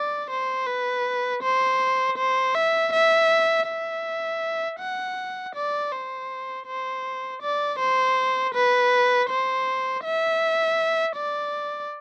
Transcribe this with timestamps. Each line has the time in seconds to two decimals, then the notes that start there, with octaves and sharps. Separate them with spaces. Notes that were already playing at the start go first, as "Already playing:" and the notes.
Already playing: D5
0.30 C5
0.67 B4
1.42 C5
2.18 C5
2.54 E5
2.93 E5
3.67 E5
4.79 F#5
5.55 D5
5.92 C5
6.66 C5
7.42 D5
7.79 C5
8.54 B4
9.30 C5
10.04 E5
11.16 D5